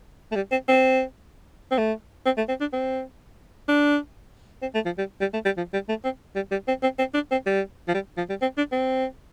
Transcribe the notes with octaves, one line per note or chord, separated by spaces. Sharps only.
A3
G3
C4
C4
C4
A3
C4
A3
C4
D4
C4
D4
C4
A3
F3
G3
G3
A3
G3
F3
G3
A3
C4
G3
G3
C4
C4
C4
D4
C4
G3
F3
G3
F3
G3
C4
D4
C4